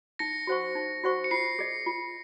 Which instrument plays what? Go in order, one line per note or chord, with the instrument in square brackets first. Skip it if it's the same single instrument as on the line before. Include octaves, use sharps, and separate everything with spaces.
[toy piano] D#4 [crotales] A#6 C#7
[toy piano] F#4 C5 F#5 C#6
D#4
F#4 C5 F#5 C#6
[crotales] C#7
[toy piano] F4 [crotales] C7
[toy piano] G#4 D#5
F4